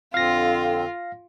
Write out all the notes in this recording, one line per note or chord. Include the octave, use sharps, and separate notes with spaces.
F2 D3 C4 F4 F5 A#6